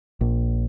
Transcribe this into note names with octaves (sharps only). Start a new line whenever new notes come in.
A#1